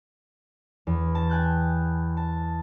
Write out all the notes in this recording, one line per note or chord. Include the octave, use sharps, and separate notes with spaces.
E2
A5
G5 G#5 F#6 G6
A5